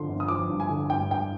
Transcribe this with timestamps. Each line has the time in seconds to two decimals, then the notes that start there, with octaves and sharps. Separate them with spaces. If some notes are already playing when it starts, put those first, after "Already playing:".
Already playing: G2 D3 F3 C6
0.09 G1
0.20 D#6
0.28 F3 D6
0.49 G2
0.60 G#5
0.69 D3
0.90 G2 G5
1.11 G2 G5